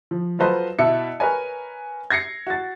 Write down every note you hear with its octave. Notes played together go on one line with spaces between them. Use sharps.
F3
F#3 F4 A4 B4 C5 D#5
B2 E4 E5 A5 C#7
A#4 B4 C#5 D#5 G#5
G#6 A#6 C7 C#7
F#4 A6